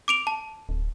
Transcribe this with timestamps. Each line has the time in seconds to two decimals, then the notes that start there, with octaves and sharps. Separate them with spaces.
0.08 D6 D7 F7
0.27 A5
0.69 D1